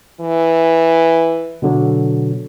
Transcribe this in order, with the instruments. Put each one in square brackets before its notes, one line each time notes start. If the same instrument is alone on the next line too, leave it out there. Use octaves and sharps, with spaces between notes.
[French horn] E3
[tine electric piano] B2 D3 F#3